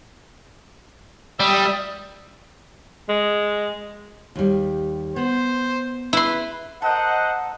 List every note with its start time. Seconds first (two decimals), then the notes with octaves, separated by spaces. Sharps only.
1.40 G3 E5 D#6
3.09 G#3
4.35 D#2 G3
5.16 B3 C5
6.13 E4 B4 C6
6.82 A4 A#4 C5 D#5 F#5